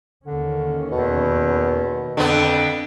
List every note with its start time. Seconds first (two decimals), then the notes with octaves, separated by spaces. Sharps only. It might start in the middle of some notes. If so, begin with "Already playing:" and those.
0.26 D#2 D3 D#3 C#4
0.92 E2 B2
2.17 F2 D3 B3